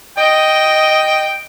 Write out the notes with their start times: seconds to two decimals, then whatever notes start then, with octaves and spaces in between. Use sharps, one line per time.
0.18 D#5 G5